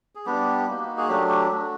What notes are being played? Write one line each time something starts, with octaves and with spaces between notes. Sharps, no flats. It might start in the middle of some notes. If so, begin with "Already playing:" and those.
G#4
G3 B3 D4 G4
A#3 D#4 F#4
G#4
F#3 A3 D4 G4
G4
A3 D4 F#4